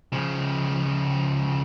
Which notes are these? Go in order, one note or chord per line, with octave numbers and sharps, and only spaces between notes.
C#3 F3